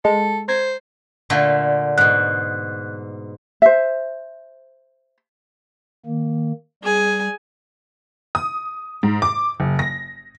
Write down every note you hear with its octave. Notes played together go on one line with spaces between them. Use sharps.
G#3 A4
C5 A#5 G#6
A#2 D3 A3
G#2 B2 F#6
C5 E5
D#3 A#3
G3 G#4 G#5
D#6
G#2
D6
F#1
A#6